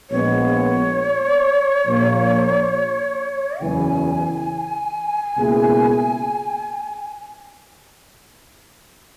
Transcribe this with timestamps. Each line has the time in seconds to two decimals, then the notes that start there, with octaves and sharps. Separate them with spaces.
0.10 A#1 A#2 G#3 B3 C#5
1.86 A#1 A#2 A#3
3.61 F#1 E2 C#3 E3 G#5
5.37 C#2 B2 A#3 E4 G#4